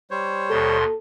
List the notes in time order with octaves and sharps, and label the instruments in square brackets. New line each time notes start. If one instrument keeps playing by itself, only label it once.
[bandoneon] G3 C5 C#5
[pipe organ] D#2 B2 C6 [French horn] A4